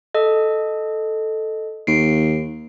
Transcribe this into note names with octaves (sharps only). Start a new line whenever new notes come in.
A4 D#5
D#2 C7 D7